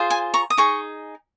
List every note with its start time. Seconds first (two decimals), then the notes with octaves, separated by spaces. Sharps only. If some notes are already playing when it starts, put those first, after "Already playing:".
Already playing: F4 G#4 C5
0.10 G#5 C6
0.34 A#5 C#6
0.50 D#6
0.57 D#4 G#4 C#6